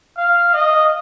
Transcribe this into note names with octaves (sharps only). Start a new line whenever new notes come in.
F5
D#5